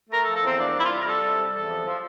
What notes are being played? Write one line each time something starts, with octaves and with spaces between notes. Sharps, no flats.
A3 A#4
A4
F3
A4
E2 C4
A#3 D4
G3 E4
F4
C3
A#4
G3 A4
C3
G3
E2 A4
F3
F3